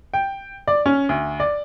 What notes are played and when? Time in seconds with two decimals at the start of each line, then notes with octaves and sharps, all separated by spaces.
0.14 G5
0.68 D5
0.86 C#4
1.09 D2
1.40 D5